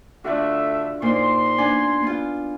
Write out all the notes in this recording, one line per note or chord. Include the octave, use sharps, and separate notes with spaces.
D3 A3 D4 F4 F#4 E5
A#2 D#4 C5 C6
B3 D4 G#5
B3 F4